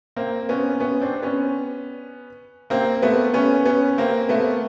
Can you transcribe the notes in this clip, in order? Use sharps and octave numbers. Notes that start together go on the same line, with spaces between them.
A#3 C4
B3 C#4
B3 C#4
C4 D4
B3 C#4
A#3 C4
A3 B3
B3 C#4
B3 C#4
A#3 C4
A3 B3